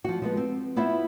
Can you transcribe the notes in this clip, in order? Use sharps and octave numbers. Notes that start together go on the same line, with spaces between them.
F3 F#4
F3 G#3 B3
C4
B3 E4 F4 C5 E5